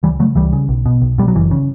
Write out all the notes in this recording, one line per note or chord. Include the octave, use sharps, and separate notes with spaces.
C#2 E3 G3
C#3 F#3 A3
C#2 E3 G3
C#3
B1
B2
B1
B2 G3
F#3
F#1 E3
C#3